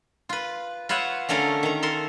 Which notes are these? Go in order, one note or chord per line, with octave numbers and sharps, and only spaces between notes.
F4 B4
F4 B4 C#5 E5 F#5
D3 A3 C#4 A4 A#4
D#3 A#5
A4 A#4 C6